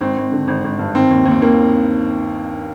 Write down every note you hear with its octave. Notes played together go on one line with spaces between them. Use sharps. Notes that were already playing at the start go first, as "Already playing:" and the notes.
G#1 C4
G#1
D3
G#1
G#1
G2
D#3 C4
D#2
D#2
C4
D#2 A#3